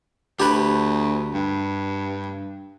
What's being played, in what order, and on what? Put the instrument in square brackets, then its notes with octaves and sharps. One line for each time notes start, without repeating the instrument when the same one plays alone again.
[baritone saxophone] D2 [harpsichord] G4 B4
[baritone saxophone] G2